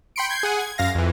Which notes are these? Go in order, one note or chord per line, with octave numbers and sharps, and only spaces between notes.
G5 B5 C6 C#7 D7
G6 G#6 C7
G#4 F#5 G#5
G#6
F#2 F5 A#6
F2 E3